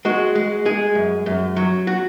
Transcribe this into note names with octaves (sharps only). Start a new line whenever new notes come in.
G#3 F#4
G#3
G#3 G#4
F#2
F#2
F#3
F#4